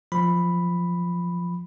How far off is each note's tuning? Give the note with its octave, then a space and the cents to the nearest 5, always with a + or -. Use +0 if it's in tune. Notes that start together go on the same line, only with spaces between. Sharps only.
F3 +0 B5 +0